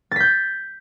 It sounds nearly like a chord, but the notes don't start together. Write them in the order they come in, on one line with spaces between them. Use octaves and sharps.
A6 B6 G6